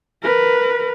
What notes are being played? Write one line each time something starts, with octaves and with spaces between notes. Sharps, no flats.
A#4 B4